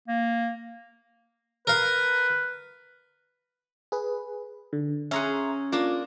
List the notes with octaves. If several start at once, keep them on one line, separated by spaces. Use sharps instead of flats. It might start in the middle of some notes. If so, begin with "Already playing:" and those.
A#3
A#4 B4 F5
G#4 B4
D3
C#4 G#4 E5 F#5 A#5 C6
A#3 D4 F4